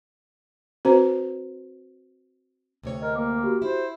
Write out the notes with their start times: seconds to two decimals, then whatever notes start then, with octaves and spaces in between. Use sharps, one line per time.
0.85 C4 F#4 B4 C5 A#5
2.83 D2 C3 C#5
3.02 A#4 D#5
3.15 A#3 D6
3.43 F#4 G4
3.62 E4 C5